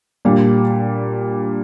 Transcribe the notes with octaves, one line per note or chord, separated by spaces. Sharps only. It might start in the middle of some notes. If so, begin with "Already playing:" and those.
A#2 G3 D4